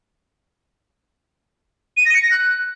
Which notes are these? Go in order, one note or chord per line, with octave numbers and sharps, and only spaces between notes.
D#7
A#6
C#7
A#6
F#6